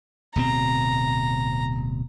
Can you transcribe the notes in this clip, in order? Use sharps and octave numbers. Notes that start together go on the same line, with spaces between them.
D1 B2 C4 A#5